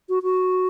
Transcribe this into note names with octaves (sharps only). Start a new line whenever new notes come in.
F#4
F#4